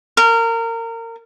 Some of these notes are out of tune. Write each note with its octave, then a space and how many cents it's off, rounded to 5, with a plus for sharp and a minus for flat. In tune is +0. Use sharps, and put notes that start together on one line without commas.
A#4 -25